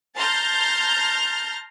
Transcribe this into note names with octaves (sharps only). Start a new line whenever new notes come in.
A5 A#5 C6 F6 G6 A6